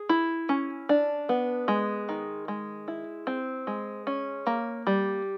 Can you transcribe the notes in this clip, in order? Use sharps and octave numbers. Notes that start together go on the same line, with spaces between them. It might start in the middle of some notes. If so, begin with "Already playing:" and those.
Already playing: G#4
E4
C#4
D4
B3
G#3
D#3
G#3
E4
C4
G#3
C#4
A#3
G3